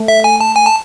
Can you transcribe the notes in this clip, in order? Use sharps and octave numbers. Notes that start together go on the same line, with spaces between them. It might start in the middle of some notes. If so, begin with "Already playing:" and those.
Already playing: A3
E5
G#5
A5
G#5
A5